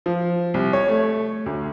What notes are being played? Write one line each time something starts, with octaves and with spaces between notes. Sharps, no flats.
F3
C2
C#5
A3
D2